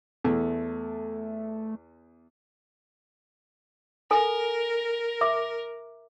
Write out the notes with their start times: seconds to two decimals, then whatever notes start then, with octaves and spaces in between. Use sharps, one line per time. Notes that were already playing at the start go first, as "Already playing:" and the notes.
0.24 E2 A3
4.11 A4 A#4 G#5
5.21 E5 D6